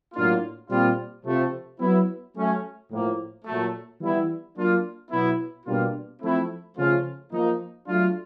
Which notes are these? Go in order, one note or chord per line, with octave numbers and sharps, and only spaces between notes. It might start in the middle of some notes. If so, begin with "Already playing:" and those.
A2 F#3 A#3 D4 F4
A#2 G3 C4 F4
C3 F3 A3
F#3 B3 E4
F#3 A3 C#4
A2 F3 A#3
A#2 F#3 A3
E3 G3 B3 E4
F#3 A#3 D4 F4
B2 F#3 B3 E4
B2 G3 A#3 D4 F4
F3 A3 C4 E4
C#3 F3 A3 C#4 F4
F3 A#3 D#4
F#3 A3 D4 F4